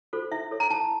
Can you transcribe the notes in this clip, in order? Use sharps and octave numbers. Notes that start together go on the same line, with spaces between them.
F4 A4 C5
E4 E5
A4 C#5
A#5
E4 A5